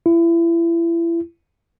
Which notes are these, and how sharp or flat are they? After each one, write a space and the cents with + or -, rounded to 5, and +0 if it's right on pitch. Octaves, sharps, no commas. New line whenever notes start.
E4 +30